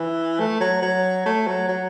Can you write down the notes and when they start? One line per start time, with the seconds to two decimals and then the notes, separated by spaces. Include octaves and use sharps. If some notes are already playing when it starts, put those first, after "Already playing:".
Already playing: E3
0.39 A3
0.60 F#3
0.82 F#3
1.26 A3
1.47 F#3
1.69 F#3